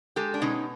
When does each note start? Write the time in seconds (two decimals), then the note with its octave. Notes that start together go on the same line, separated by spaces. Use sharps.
0.16 G#3 G4 A4
0.34 D4
0.41 B2 C#4 D#4